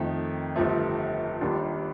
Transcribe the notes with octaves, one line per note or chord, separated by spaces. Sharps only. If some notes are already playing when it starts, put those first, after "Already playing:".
Already playing: F2 D#3 A3
G1 G2 F3 A3
D#2 D#3 G3 D4 F4